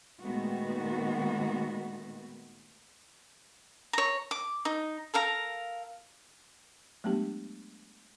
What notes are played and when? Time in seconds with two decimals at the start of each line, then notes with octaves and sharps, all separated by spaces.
0.23 A#2 D#3 G#3 A3 B3 F#4
3.93 C#5 A#5
4.31 D6
4.65 D#4
5.14 A4 A#4 F5 A#5
7.04 F#3 G#3 A3 B3 D4 G4